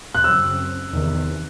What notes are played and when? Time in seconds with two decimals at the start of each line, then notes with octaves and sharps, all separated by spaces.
0.14 F#6
0.24 F#2 C#3 F#3 C4 E6
0.92 E2 C3 D#3